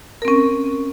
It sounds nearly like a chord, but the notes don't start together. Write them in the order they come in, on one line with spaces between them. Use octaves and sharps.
A#4 C4 C#4